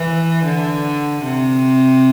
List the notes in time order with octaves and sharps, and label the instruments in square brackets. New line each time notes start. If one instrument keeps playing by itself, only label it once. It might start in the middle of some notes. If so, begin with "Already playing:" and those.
Already playing: [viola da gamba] E3
D3
C3